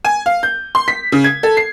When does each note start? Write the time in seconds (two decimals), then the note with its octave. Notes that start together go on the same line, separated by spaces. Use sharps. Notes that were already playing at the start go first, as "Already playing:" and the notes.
0.05 G#5
0.26 F5
0.43 G6
0.75 C6
0.88 B6
1.12 C#3
1.24 G#6
1.43 A4
1.57 C7